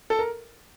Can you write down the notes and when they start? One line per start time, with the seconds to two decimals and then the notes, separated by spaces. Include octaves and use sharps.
0.10 A4
0.19 A#4